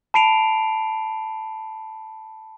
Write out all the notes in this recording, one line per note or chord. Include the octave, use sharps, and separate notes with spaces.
A5 B5 C7 D7 F7